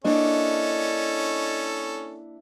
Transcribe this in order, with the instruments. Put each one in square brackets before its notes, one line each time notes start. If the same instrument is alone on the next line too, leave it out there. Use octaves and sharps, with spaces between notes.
[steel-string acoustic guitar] A#3 D4 E4 [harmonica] C#4 A4 [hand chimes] D#5